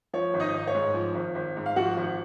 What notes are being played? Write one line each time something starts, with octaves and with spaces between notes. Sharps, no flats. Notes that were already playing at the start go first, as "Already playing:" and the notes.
F3 C#5
G#1
D#4 D#5
G#1
C#5
G#2
F3
G#1
G#1
G#2
F5
F3 F#4 F#5
G#1